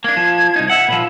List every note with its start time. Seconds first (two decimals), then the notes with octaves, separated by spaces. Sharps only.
0.04 A#3 D4 G#6
0.17 F3
0.56 C2 D#4
0.69 E5 F#5
0.88 A#2 F3 B5